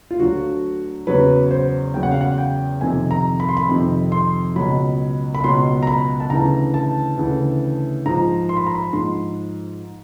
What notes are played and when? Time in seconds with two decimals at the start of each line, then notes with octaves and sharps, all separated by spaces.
0.11 F4
0.20 D2 D3 F#3 F#4
1.07 E2 C#3 F#3 B4
1.51 C5
1.94 E2 C#3 F#3 G5
2.03 F#5
2.11 F5
2.21 F#5
2.38 G5
2.81 F2 C3 D#3 G#5
3.11 A#5
3.40 B5
3.49 C6
3.57 B5
3.69 F2 C3 D#3
4.12 C6
4.56 C#2 B2 F#3 B5
5.35 B5
5.44 C#2 B2 F#3 C6
5.83 A#5
5.87 B5
6.20 A5
6.30 D2 C#3 E3 A#5
6.74 A5
7.18 D2 C#3 E3
8.06 G#2 F3 A#5
8.49 C6
8.57 B5
8.67 A#5
8.75 B5
8.92 G#2 F3 C6